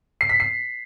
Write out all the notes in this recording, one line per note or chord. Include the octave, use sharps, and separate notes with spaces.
C7
B6
C7